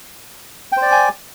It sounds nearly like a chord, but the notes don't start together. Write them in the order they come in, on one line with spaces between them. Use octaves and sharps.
G5 C5 D5 D6 G#5